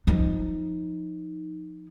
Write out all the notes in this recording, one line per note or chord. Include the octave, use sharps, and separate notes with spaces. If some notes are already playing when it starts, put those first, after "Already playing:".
F3 D#4